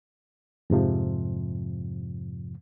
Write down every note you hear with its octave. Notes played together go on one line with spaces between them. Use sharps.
F2 G#2 C3 F3